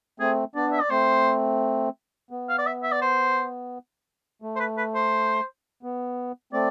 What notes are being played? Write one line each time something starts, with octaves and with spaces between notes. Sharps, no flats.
A3 C4 G#4
B3 D4 D5
E5
D5
A3 C4 C5
B3
F5
D5
E5
E5
D5
C5
A3
C5
B4
B4
C5
B3
A3 C4 D5